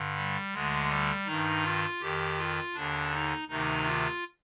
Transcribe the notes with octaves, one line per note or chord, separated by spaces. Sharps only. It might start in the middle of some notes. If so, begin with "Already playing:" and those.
Already playing: G2 D3
G3
D2 D3 G#3
G3
G2 D#3 D#4
F4
F2 D#3 G4
F4
D#2 D3 D4
D#4
D2 C3 D#3 D#4
F4